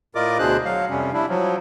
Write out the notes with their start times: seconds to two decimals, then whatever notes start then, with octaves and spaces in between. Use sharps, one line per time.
0.15 A2 F4 A#4 D5 D#5 D6
0.39 D2 B2 D4 G#4 C5 F#6
0.65 F#3 F5
0.90 F2 C3 G3 C#4
1.13 G3 D4 E4
1.29 F3 F#3